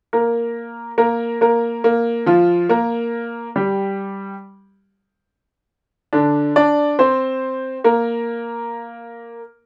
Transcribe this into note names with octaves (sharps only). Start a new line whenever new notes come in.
A#3 A#4
A#3 A#4
A#3 A#4
A#3
F3 F4
A#3 A#4
G3 G4
D3 D4
D4 D5
C4 C5
A#3 A#4